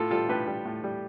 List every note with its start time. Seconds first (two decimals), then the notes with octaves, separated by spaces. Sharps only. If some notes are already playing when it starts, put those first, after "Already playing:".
Already playing: A2 F4 A4
0.11 G3 F4 A4
0.29 A2 G4 B4
0.47 G3
0.65 A2
0.84 G3